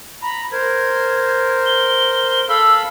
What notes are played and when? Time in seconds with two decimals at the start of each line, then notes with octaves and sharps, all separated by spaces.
0.22 A#5 B5
0.52 A#4 C5 G#6
1.66 G7
2.49 A4 F5 B5 E6